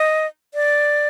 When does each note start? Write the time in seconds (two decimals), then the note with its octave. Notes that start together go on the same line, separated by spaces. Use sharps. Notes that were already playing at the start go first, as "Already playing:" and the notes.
Already playing: D#5
0.54 D5